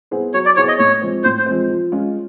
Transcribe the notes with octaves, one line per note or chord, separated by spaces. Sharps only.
B3 E4 G#4 C5
F#3 C#5
D5
B3 E4 G#4 C5 C#5
D#5
A2 C#5
F3 G#3 C4
A2 C5
C5
F3 G#3 C4
F3
G#3 C#4 F4